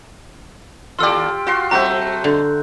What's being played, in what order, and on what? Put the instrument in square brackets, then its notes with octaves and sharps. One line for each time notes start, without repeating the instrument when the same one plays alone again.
[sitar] D#2 A4 D5 [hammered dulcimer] F4 G4 [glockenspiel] C6 E6
[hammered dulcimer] F4 C6 [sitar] F#4
[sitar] F#3 A3 C4 [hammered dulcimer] F#4 E5 [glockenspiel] A#5 G6
[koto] D3